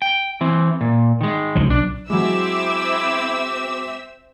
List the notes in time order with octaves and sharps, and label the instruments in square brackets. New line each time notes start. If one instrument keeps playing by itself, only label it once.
[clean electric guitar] G5
E3 C4
A#2
D#3 G#3
[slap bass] C#2 F3 F#3
[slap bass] B1 [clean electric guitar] D4
[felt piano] F#3 G#3 [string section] C4 E5 E6 [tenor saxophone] E4 [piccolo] D6